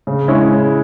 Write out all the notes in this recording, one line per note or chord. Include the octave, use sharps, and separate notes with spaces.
C#3
G#3 C#4 E4